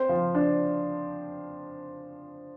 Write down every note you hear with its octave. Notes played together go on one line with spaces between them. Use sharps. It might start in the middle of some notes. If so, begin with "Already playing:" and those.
Already playing: C4 C5
F3 F4
D4